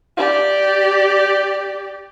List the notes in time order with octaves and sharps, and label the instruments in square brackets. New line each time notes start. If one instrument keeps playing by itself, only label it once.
[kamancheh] G4 D5